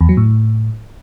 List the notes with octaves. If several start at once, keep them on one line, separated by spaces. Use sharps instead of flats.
E2
F#3
A2